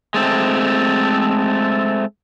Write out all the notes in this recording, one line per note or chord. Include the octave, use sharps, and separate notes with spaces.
G#3 A3 C4